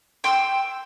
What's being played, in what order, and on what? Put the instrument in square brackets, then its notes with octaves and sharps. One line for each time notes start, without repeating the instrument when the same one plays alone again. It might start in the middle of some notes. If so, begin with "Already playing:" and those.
[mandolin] G5 C6 D#6 E6